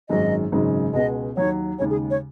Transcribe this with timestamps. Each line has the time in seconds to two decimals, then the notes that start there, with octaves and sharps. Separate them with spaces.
0.09 G#1 F#2 D#3 G#3 D#5
0.52 G#1 F#2 C#3 G#3 D#4
0.93 C#2 B2 G#3 D#5
1.36 D#2 D#3 F#3 C#5
1.79 D#2 C#3 G#3 C#5
1.90 G#4
2.10 C#5